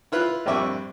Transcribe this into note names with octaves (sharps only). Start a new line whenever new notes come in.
E4 F4 B4
A#1 G2 C4 D5 E5 C#6